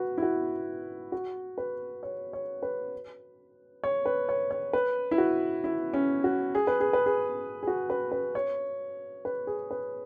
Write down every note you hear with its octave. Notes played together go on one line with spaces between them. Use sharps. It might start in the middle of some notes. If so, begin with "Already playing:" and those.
Already playing: F#4 B4
E4
F#4
F#4
B4
C#5
C#5
B4
C#5
B4
C#5
C#5
B4
E4
F#4
E4
C#4
F#4
G#4
B4
G#4
B4
G#4
G#4
F#4
B4
B4
C#5
B4
G#4
B4